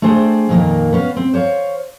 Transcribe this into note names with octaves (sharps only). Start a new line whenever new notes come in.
A3 D4 G#4 C5 G5
F2 A#2 D#3 A#3
B3 C#4 F5
C4
C5 C#5 F5